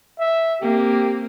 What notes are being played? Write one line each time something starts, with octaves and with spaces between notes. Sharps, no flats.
E5
A#3 C4 G4